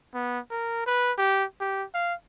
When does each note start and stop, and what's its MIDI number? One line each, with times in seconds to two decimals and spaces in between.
0.14 0.39 59
0.50 0.84 70
0.86 1.12 71
1.18 1.44 67
1.60 1.84 67
1.94 2.14 77